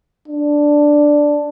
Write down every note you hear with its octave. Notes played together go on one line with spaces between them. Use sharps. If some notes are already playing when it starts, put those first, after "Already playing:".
D4